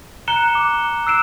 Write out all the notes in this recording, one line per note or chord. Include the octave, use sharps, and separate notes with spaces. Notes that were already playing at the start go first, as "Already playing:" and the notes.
A#5 F#6 C#7 E7 G7
D6
E6 F#6 C7 D7 E7